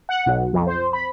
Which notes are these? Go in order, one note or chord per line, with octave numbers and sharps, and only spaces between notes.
F#5
B1
F2
C5
B5